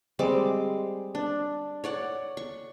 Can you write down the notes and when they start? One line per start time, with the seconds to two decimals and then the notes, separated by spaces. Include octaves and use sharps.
0.19 G3 G#3 C4 D6
1.15 D4
1.84 C#5 D5 F#5
2.37 C#6